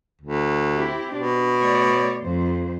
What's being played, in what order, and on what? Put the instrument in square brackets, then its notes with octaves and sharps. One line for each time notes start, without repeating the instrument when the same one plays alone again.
[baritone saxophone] D2
[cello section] C4 E4 G4
[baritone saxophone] B2 [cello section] D4
[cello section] A3 C#5 D5
F2 C5